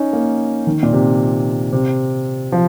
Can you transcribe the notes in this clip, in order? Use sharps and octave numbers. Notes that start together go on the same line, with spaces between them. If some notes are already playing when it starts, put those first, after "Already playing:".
Already playing: C#4 D#4
A#3
D#3
A#2
C3
C3
F3